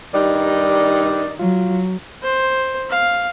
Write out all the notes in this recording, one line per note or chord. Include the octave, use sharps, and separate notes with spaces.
G2 D#3 G3 D#4 D5
F#3 F4
C5
F5